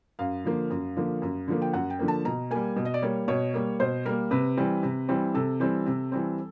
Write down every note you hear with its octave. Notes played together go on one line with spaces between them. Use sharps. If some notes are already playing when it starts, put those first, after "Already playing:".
F#2 F5
D3 F3 A#3
F#2
D3 F3 A#3
F#2
D3 F3 A#3
G5
F#2 F#5
G5
D3 F3 A#3
A5
B2 A#5
G3 A#3 G#5
B2
D#5
D5
G3 A#3 C#5
B2 C#5
G3 A#3
B2 C5
G3 A#3 A#4
C3 B4
E3 G3 C4
C3
E3 G3 C4
C3 A4
E3 G3 C4
C3
E3 G3 C4